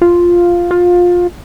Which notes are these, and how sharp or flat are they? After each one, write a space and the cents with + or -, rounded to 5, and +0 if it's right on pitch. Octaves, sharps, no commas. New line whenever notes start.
F4 +0
F4 +20